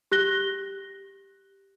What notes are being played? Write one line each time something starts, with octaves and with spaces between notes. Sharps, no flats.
G4 F#6 A#6 G7